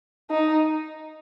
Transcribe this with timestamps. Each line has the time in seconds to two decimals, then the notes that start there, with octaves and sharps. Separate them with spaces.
0.31 D#4